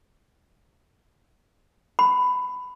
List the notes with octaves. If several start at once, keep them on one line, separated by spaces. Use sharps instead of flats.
B5